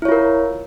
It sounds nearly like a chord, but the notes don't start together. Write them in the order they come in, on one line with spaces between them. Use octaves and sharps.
E4 C#5 F4 A#4